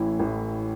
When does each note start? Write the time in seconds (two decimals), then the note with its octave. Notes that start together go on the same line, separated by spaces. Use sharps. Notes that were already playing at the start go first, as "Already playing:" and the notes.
Already playing: A1 A2 E3
0.19 A1 A2 E3